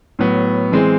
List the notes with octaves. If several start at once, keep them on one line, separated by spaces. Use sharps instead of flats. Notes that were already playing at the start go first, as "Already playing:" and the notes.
A2 F#3 B3
E3 G#3 C4